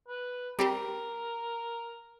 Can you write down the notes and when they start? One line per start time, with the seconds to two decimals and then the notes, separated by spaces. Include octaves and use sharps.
0.08 B4
0.59 G3 C4 G4 A#4